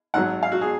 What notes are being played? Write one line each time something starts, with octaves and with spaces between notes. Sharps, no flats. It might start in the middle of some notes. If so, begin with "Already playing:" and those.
G#1 G#2 F#3 F#5
F5
F#4
G#4